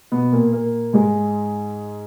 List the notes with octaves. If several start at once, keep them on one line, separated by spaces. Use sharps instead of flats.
B2 B3
A#2 A#3
A#2 A#3
G#2 G#3